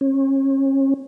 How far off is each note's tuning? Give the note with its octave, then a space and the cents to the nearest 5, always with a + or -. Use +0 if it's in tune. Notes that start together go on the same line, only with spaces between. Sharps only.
C#4 -35